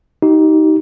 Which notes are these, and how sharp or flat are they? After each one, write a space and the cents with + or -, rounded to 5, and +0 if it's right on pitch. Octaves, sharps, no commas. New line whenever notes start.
D#4 +15 G4 -30